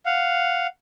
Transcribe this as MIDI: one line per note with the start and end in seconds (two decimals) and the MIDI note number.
0.06 0.67 77
0.06 0.67 78